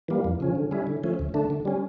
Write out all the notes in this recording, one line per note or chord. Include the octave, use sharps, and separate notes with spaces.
E3 G3 A#3
F2
C#3 F3 C#4
D3
G3 C#4 E4
D3
F3 A3 C#4
D2
D3 A3 D4
D3
G3 C#4